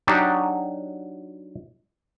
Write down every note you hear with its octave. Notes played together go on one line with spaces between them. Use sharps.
F#3 D4 D#4 F#4 G4